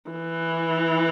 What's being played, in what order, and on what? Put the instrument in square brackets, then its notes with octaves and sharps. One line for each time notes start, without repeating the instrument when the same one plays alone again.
[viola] E3